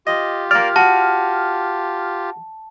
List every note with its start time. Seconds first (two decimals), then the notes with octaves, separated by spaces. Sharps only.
0.07 F4 G4 D#5
0.51 A#3 D5 F6
0.76 F#4 A5